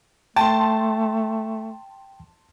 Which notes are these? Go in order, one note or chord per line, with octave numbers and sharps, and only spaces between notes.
A3 G5 A5 C6